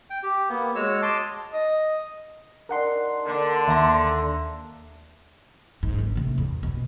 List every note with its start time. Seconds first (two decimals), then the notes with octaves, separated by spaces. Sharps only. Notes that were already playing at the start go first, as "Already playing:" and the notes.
0.10 G5
0.23 G4
0.49 A#3 B3
0.75 G#3 F#4 C#5 E6
1.02 D#5 A5 C6 D6
1.53 D#5
2.69 D4 D#4 G4 A#4 F#5 C6
3.27 D3 A#3 D5 A5
3.68 D#2 E5 A#5 C6 A#6
5.83 G#2
5.99 F#1
6.15 A2 C3
6.38 E2
6.63 B2